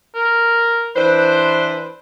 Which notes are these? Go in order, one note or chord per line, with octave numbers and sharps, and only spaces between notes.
A#4
E3 D4 B4 C5